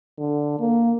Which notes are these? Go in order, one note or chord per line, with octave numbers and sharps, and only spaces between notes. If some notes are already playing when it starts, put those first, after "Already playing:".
D3
A#3